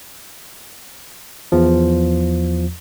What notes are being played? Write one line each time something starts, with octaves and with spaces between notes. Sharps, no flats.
E2 F3